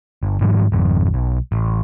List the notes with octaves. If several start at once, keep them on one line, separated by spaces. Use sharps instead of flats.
G1
G#2 D#3 F3 G3
G#1 F2
B1
A1